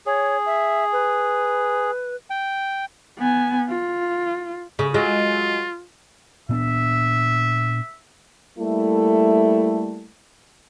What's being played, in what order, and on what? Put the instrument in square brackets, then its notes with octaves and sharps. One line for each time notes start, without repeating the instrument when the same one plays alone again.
[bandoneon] G#4 [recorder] C#5
[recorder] E5
B4
[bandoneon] G5
[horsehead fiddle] B3 G#5
F4
[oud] C#3
[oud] F#3 G#3 [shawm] F4
[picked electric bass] A#2 B3 D4 [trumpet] E5
[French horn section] G3 A3 A#3 E4 A4